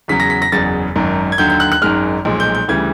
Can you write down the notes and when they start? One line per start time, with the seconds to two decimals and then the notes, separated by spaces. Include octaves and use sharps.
0.08 E2 C#3 F#3 B6
0.20 A#6
0.30 B6
0.42 A#6
0.52 F#1 E2 C#3 F#3 A6
0.95 G#1 F#2 D#3
1.32 G#6
1.38 D#2 D3 F#3 G6
1.50 G6
1.60 F#6
1.72 F#6
1.82 G#1 F#2 D#3 G#3 F6
2.25 B1 A#2 F3 G#3
2.40 G6
2.55 G6
2.68 D2 C#3 E3 G3 G#6